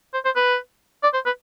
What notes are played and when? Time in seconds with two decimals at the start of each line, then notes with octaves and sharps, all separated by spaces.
0.13 C5
0.25 C5
0.36 B4
1.03 D5
1.14 C5
1.26 B4